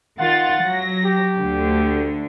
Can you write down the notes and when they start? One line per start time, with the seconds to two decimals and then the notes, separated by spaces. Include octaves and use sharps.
0.19 D#3 F4 F#5 A6
0.62 F#3 A#6
1.05 G4
1.39 D2 D3